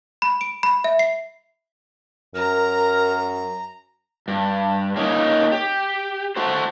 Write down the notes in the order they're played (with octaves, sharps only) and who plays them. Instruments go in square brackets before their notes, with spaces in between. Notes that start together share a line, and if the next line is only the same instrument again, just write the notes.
[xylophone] B5
D7
B5
E5
C7
[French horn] F#2 [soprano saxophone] A#4 [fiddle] A#5
[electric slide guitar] G2
A#3 C#4 D#4
G4
A3 F#4 C5